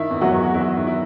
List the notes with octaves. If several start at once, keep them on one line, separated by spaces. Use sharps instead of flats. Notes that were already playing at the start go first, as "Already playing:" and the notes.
Already playing: D#3 E4
E2
F#3 F#4
E2
F#4
E2 E4
D#3
E4